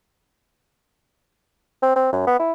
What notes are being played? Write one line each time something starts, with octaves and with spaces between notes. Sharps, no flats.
C4
C4
F#2
B3
E4